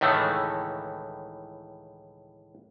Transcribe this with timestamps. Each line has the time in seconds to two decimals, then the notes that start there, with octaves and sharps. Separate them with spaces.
0.01 C#2 A2 D#3 E3 A3